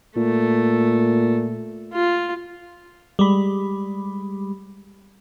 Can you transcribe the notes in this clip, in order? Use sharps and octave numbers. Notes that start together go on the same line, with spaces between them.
A#2 A3
F4
G3 G#3 B5